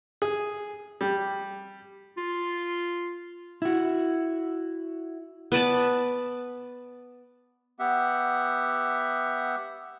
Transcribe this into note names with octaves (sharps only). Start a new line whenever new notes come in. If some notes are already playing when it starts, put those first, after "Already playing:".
G#4
G3
F4
E4 F#4
B3 B4 D5 A5
B3 G4 E5 F#5